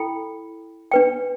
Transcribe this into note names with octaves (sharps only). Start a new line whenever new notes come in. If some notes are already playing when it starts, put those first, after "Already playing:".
Already playing: E4 A4 G5 B5
D4 B4 G5